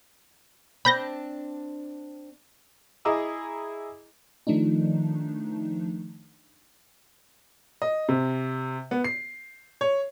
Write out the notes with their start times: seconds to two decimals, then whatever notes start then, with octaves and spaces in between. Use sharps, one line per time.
0.85 C4 D4 B5 G6 A#6
3.05 E4 G#4 D#5 A#5 D6 E6
4.47 D#3 F3 A3 D4 D#4
7.82 D#5
8.09 C3
8.91 B3
9.04 C7
9.81 C#5